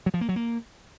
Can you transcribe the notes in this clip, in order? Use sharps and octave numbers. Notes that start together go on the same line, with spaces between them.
F#3
F3
A#3
F#3
A#3